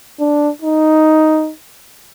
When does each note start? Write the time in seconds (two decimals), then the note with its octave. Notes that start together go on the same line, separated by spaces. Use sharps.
0.20 D4
0.62 D#4